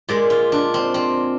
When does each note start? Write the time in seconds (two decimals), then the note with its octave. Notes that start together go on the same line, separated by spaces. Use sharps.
0.09 A#2 G#3 D5
0.30 F4
0.52 D4
0.74 C4
0.94 C4